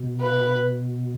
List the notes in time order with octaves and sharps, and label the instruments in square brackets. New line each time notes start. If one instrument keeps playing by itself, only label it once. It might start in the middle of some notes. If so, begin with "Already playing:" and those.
Already playing: [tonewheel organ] B2
[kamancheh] B4